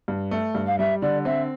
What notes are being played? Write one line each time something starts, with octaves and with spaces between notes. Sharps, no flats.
G2
A3
G2
F5
G3 E5
D3 D5
C4 E5